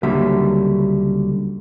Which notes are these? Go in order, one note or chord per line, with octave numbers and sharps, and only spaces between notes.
C#2 D3 F#3 G3 A#3 E5